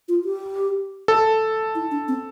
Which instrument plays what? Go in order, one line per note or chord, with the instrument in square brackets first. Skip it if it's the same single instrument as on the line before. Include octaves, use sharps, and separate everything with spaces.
[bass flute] F4
G4
[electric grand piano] A4
[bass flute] E4
D4
C4